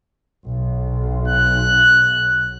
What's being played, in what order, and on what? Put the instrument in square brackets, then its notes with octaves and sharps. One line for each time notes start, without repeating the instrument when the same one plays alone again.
[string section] B1
[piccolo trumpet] F#6